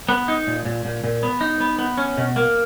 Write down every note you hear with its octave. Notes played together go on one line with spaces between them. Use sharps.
B3
D#4
A#2
A#2
A#2
A#2
B3
D#4
B3
B3
C#4
B2
A#3